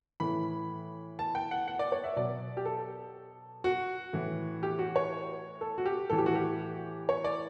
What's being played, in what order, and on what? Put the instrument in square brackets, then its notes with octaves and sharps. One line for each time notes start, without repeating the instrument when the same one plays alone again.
[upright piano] A2 E3 B5
A5
G5
F#5
F#5
D5
C#5
E5
B2 F#3 D5
G4
A4
F#4
A2 E3
G4
F#4
C#5
A4
F#4
G4
A2 E3 A4
G4
F#4
G4
C#5
D5